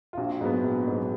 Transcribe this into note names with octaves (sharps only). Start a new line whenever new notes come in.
F4
A#1 F#4
G#2 F#3 B3
A#1
G#2 F#3 B3